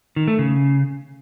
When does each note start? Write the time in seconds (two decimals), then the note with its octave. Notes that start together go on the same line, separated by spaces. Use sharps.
0.16 D#3
0.28 A3
0.39 C#3